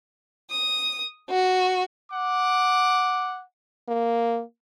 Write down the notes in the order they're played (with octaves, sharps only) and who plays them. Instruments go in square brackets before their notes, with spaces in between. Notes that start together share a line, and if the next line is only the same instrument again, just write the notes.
[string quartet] D#6
F#4
[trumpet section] F#5 D6
[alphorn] A#3